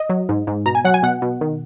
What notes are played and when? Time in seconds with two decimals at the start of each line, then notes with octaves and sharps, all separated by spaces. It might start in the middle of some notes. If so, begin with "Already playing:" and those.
Already playing: D#5
0.10 F#3
0.29 G#2
0.47 G#2
0.66 B2 A#5
0.75 G#5
0.85 F#3 F#5
0.94 G#5
1.03 B2 F#5
1.22 B2
1.41 D#3